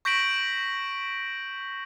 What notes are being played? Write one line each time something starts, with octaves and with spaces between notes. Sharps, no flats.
C#6 G6 A#6 B6 D7 F#7